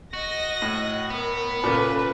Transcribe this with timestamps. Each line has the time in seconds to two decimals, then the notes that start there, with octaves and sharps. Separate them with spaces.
0.13 F#4 D#5 A#6
0.62 A2
1.10 B3 A#4
1.64 A#2 C#3 A4 B4